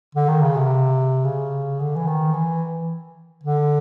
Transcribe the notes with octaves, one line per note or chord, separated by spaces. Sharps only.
D3
D#3
C#3
C3
C#3
D3
E3
D#3
E3
D3